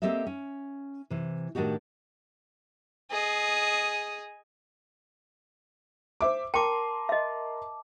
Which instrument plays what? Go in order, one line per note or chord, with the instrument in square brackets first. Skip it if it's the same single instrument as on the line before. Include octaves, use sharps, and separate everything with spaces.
[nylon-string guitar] A#3 C4 G4 A4 D#5 E5
C#4
C3 E3
A2 D#3 D4 D#4 F#4 G4
[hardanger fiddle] G#4 D#5
[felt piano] C5 E5 D6
[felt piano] A#4 C6 [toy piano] G5 [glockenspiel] A5 D6
[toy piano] D#5 E5